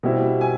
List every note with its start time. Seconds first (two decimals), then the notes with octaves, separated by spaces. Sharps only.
0.03 B2 G3 C4 E4
0.41 G#5